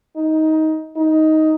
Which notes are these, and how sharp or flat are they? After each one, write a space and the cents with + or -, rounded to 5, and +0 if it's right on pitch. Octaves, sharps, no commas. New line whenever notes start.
D#4 +15
D#4 +10